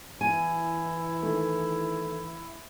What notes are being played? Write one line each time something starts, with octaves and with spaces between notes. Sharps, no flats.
E3 E4 G#5
D#3 A3